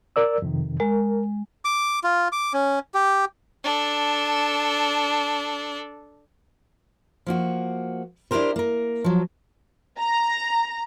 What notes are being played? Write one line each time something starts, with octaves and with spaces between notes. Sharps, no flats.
A#4 D5 E6
F2 C3 D#3
G#3 A#4
D6
F4
D6
C#4
G4
D4 A4
F3 A#3 F#4
D4 E4 F#4 G4 A#4 C5
A#3 A#4
F3 F#3
A#5